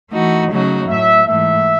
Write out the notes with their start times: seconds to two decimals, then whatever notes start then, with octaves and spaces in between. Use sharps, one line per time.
0.12 E3 A3 D#4 F#4
0.50 C#3 F#3 A3 D#4 F#4
0.88 A2 F#3 A3 E5
1.26 G#2 E3 A3 E5